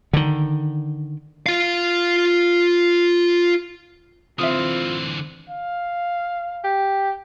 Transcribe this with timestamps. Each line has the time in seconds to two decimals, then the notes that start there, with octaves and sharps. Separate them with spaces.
0.13 D3 D#3
1.46 F4 F5
4.39 D3 E3 C4 F4 E5 D#6
5.50 F5
6.64 G4